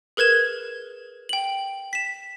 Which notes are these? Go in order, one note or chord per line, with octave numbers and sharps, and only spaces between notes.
G#4 A#4 B4 G#6 E7
G5 F#7
B6 E7